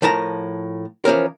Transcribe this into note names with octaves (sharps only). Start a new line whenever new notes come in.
A2 F3 A#4 A5 A#5
E3 F3 C#4 A#4